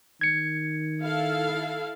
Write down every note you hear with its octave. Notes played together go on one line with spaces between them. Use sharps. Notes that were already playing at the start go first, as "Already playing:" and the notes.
D#3 G#6 C#7
E4 A4 F5